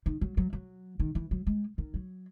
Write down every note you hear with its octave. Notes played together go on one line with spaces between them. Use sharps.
D#3
F#3
F#3
F#3
D#3
E3
F#3
G#3
D#3
F#3